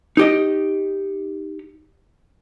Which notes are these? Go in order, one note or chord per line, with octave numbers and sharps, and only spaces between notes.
D#4 G4 D#5